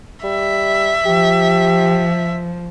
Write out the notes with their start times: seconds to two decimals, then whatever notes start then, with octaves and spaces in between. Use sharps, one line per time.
0.24 G3 E5
1.06 F3 G4